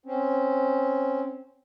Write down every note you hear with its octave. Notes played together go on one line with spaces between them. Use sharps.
C4 C#4